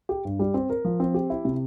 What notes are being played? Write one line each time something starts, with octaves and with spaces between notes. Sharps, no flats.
G4
G2
G3
C4
A#4
F3
C4
G4
E4
C3